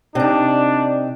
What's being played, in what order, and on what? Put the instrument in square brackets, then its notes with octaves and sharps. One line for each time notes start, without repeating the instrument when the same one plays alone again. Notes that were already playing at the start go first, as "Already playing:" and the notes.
[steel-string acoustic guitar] C3 D#4 [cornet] D4